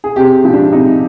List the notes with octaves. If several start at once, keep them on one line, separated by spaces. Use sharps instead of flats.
G#4
C3 G4
F3 G#3
D4
C3 D#4